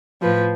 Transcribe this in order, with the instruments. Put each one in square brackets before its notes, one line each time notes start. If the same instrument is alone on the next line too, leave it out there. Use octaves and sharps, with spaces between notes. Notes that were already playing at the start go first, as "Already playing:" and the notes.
[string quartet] A2 F3 B4